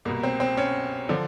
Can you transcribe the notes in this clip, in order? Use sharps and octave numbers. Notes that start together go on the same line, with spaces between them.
C2 B2 A#3
C4
C4
C#4
D3 F3